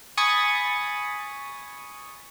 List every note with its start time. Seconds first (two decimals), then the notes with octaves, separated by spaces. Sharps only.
0.17 G#5 B5 C#6 D#6 A6